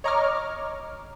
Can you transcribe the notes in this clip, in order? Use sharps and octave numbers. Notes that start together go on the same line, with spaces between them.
C#5 D#5 A#5 C#6 D6 F6